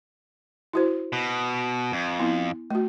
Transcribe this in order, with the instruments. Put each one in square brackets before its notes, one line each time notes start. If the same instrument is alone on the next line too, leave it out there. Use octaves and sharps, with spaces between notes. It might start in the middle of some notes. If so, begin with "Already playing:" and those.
[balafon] E4 F#4 C5
[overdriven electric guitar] B2
F2
[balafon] B3 E4
A3 F#4